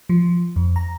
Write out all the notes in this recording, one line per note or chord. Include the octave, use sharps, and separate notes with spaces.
F3
F2
A#5